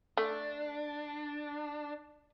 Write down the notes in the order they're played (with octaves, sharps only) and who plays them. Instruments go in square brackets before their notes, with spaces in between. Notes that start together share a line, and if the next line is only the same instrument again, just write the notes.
[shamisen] A3 [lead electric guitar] D4